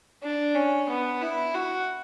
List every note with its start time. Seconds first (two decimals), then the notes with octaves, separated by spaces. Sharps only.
0.23 D4
0.55 C#4
0.89 B3
1.21 E4
1.54 F#4